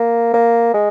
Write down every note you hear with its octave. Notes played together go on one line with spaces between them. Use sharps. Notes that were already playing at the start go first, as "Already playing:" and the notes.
Already playing: A#3
A#3
G#3